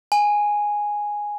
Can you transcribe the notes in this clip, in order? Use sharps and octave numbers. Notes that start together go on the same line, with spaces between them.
G#5